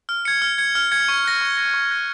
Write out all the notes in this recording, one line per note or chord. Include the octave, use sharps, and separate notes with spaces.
F6
G#6 C#7
F6
G#6 C#7
F6
G#6 C#7
C#6
F#6 A#6
C#6
F#6 A#6
C#6
F#6 A#6